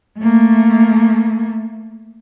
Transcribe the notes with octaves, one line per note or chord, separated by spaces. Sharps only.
A3 A#3